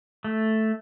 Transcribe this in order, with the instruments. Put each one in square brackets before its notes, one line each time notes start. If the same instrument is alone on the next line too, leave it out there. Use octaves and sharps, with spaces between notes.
[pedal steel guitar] A3